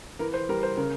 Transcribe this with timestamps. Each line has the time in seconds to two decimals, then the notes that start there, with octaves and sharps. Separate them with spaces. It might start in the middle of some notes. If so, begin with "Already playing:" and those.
0.19 E3 A#4
0.34 C5
0.49 G3 A#4
0.63 C5
0.77 C#3 A#4